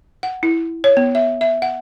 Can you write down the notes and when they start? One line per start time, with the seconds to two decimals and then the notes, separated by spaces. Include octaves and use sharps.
0.23 F#5
0.43 E4
0.84 C#5
0.97 B3
1.15 E5
1.41 E5
1.62 F#5